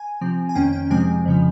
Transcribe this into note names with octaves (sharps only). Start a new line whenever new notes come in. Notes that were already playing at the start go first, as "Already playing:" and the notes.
Already playing: G#5
C3 F3 C4
G#5
F2 D#3 A#3 C#4 G5
G5
F2 C3 F3 G#3 C4 G#5
F2 C#3 F3